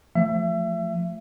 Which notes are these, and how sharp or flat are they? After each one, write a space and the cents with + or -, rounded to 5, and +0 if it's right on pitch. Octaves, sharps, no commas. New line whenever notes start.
F3 +0 A3 +0 E5 +30